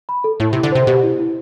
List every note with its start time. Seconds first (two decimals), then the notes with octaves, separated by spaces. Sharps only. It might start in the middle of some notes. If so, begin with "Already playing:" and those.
0.09 B5
0.24 A4
0.40 A2 E4
0.53 C3
0.56 E4
0.63 D3
0.72 C3 C5
0.87 B2 G4
1.03 E4
1.19 E4